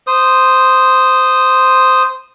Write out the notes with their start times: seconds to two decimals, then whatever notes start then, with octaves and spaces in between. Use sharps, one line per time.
0.07 C5 D#6